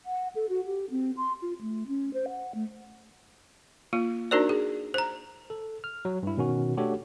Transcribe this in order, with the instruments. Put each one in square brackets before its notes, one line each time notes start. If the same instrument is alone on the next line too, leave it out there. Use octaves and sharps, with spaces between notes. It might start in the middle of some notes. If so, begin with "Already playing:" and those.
[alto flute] F#5
A4
F#4
G4
C4
C6
F4
A3
C#4
C5
F#5
A3
[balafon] A#3 F4
D4 D#4 F#4 A#4 C5 D5
G#4
C5 A#5
[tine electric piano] A4
F6
F#3
G2 E4
B2 D#3 C#4 F#4
A3 D4 F#4 G4 A4 C#5